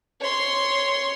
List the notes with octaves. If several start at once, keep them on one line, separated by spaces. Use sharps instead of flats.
C#5 C6